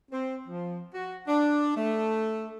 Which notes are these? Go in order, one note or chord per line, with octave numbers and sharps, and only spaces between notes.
C4
F3
F#4
D4
A3